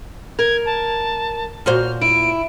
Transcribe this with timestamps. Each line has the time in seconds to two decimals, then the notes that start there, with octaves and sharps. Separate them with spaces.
0.39 A#4 G#6
0.66 A5
1.66 A#2 F#4 C5 F6
2.01 E4 D7